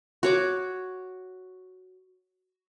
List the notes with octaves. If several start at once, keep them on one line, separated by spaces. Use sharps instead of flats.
F#4 C#5 D6